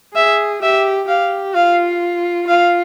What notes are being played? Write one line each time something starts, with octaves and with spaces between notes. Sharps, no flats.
G#4 E5
G4 E5
G4 F5
F4 F5
F4 F5